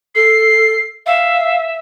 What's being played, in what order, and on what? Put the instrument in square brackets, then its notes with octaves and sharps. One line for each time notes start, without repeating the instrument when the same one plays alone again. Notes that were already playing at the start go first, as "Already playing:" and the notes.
[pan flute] A4 [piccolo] C7
[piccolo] E5 [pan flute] F5